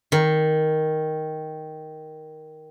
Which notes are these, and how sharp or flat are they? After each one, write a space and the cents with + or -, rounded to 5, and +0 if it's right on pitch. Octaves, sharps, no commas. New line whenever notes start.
D#3 +5